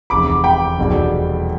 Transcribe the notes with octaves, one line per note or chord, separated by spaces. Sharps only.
F1 E2 C3 B5 D6
G5 B5
F1 E2 B2 G3